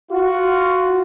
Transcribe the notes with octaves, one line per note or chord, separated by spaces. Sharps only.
F4 F#4